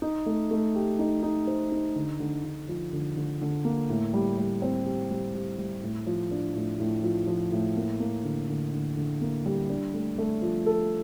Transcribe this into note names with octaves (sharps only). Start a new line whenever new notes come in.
D#4
A3
A3
G4
D#4
D#4
C5
D#4
D3
D3
D3
F3
D3
D3
D3
A#3
A2
G3
G3
C4
G4
G3
G3
G3
A2
F3
D4
A2
A2
F3
F3
A2
A#3
A#3
D3
D3
D3
D3
A#3
G3
D4
A3
A3
F3
A4